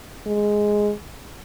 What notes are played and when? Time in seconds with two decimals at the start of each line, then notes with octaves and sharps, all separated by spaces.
0.26 G#3